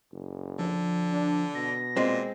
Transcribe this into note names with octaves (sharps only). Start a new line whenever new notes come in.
F#1
D3 F3
D4
B2 A#6
A#2 G#3 C4